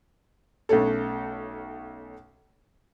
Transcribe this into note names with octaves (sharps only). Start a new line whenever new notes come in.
B1 A3 C#4 A4